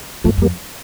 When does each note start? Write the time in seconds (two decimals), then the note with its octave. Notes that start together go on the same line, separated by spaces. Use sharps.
0.24 G2 F3 A3
0.38 F2 G3 A#3